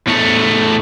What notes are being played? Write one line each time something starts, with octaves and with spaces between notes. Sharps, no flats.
E2 A3